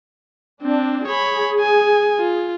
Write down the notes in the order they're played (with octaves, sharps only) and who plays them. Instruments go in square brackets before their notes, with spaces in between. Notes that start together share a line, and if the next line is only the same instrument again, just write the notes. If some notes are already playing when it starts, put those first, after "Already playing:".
[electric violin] C4 [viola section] D4
[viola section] G#4 [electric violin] C#5 B5
[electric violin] G#5
F4